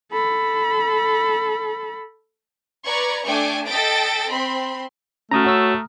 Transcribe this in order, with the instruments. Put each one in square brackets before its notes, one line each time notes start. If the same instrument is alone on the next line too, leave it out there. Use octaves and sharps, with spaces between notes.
[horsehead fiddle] A4 B5
[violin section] B4 D5 A#5 C#6 G#6
A3 D4 G5 G#5 C#6 D6
A4 D#5 G5 A6 B6 D7
C4 B5 C6
[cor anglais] A3 [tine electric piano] C#4 F#4 [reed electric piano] A#5 D#6 F6
[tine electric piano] F#4 C#5 E6